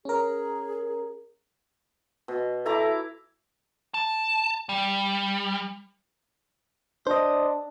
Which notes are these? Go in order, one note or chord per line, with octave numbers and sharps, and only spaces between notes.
C#4 G#4 A#4
B2
E4 A4 A#5 D6
A5
G3
D4 C5 D#5